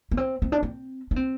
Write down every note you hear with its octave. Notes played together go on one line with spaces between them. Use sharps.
B3
C4
C4
D4
C4
D4
C4